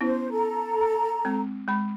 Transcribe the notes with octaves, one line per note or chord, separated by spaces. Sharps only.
B3 C#4 E4 C5
A4 A#5
G#3 C4
G#3 B5